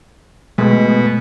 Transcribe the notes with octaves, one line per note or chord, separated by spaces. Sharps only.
B2 G#3 A3